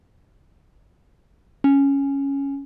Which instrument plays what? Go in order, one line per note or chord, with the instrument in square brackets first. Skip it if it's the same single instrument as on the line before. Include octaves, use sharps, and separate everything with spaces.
[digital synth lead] C#4